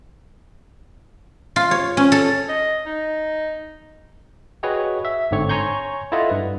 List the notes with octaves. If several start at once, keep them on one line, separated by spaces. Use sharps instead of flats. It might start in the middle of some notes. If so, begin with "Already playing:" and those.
F4
C#5
C#4
A4
D#5
D#4
F#4 G#4 B4 C#5 D#5 G5
E5
G1 G#2 D3 C4 C#5 C#6
C#5 G#5 A#5 C6 C#6 G6
E4 F4 A4 D#5 F#5
G2 B4